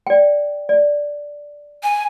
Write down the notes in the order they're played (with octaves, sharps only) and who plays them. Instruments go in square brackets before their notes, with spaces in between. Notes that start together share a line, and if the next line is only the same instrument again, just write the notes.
[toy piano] D5 G5
D5
[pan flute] G#5